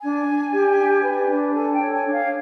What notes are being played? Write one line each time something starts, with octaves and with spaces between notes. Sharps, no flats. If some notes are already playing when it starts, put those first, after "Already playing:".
D4 G#5
D4
G4
D4
B4
D4
A4 G#5
G5
C#5
G#5
D4
F5